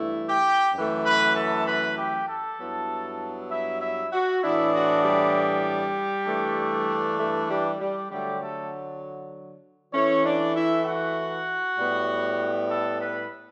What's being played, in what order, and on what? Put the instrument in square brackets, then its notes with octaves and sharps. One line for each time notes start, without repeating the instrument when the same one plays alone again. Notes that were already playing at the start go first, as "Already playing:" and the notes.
Already playing: [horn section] G2 E3 A3 E4
G4 G5
F#2 E3 A3
B4 B5
A4 A5
B4 B5
G4 G5
A4 A5
G2 F#3 B3 E4
E4 E5
E4 E5
F#4
A2 E3 B3 D4 E4
F#4
G3 G4
G2 E3 A3 D4
A3 A4
G3 G4
G3 G4
D3 F#3 G3 A3 G4
A3 A4
E3 A3 C#4 E4 C#5
D4 D5
E4 E5
F#4 F#5
A2 G3 B3
A4 A5
B4 B5